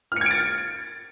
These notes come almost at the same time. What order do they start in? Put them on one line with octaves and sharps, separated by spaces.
F6 C#7 G#6 D7 A6